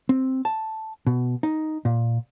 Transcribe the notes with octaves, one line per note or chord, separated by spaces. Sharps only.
C4
A5
B2
D#4
A#2